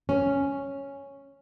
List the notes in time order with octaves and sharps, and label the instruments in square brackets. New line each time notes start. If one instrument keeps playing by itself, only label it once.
[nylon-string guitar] C#4